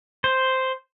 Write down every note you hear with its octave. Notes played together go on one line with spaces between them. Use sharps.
C5